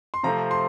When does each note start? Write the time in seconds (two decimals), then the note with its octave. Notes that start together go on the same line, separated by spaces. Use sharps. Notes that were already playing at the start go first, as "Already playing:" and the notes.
0.14 C6
0.23 C3 F3 A3 C4 A#5
0.51 C6